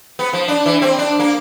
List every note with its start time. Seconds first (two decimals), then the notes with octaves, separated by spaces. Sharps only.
0.19 B3
0.33 F3
0.48 D4
0.66 E3
0.82 C4
0.99 D4
1.19 A#3